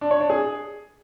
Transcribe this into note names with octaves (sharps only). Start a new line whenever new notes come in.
D4
C#5
D4
G#4